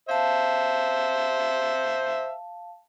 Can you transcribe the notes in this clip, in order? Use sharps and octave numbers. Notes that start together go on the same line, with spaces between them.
C5 E5 F5 A5